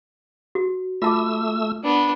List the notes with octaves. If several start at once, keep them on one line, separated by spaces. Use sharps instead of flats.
F#4
A3 F4 A5 D6 E6
B3 D4